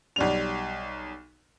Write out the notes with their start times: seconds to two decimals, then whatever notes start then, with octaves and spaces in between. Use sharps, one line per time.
0.16 B1 G3 F7